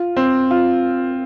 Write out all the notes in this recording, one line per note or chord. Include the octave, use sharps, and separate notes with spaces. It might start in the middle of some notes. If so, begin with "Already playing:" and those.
Already playing: F4
C4
F4